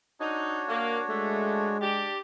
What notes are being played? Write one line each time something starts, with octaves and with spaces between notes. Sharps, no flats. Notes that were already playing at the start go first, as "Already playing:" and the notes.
D4 D#4 F#4 C#5
A#3
G#3 A3
D4 G4